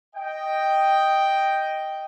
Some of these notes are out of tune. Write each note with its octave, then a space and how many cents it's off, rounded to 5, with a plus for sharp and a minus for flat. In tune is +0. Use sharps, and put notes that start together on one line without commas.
D#5 +0 G5 +0